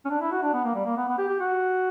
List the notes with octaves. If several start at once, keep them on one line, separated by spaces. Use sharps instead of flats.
C#4
D4
E4
F#4
D4
B3
A#3
G3
A#3
B3
B3
G4
G4
F#4